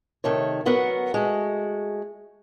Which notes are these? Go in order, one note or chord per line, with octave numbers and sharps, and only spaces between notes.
C3 D#3 A3 C#5
D2 F#3 B3 F#4 A#4 F#5
G#3 A3 F#4